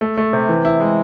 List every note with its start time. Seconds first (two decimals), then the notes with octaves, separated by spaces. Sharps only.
0.01 A3
0.17 A3
0.33 C3
0.49 E3
0.65 E4
0.80 G#3